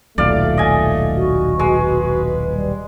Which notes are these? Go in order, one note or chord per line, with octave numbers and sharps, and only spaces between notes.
D#1 B1 A3 D5 F5
D#5 G#5
F#4
G#3 B4
G3